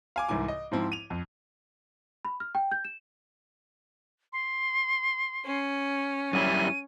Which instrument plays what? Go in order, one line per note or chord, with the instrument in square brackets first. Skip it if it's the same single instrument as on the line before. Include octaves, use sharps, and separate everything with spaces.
[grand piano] F5 G#5 D6
C2 G#2 E3 G#5 D6
D#5
G#2 F3 C4 E4
D#7 F7
F2
[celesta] B5
F6
G5
G6
E7
[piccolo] C6
[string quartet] C#4
[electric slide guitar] F#2 G3 E4 [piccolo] D#7